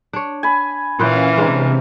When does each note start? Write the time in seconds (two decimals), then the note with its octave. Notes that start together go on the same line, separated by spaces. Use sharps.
0.13 D4 C#5
0.43 G#5 B5
0.99 A#2 E3 C#4 B4 F5 G5
1.38 C3 G#3 D4 A#4